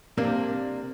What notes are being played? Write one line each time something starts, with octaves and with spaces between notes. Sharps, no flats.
C3 A#3 C4 D4